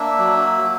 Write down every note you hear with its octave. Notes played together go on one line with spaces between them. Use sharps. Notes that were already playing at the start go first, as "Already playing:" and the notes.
Already playing: A#3 D4 E5
F#3
F#3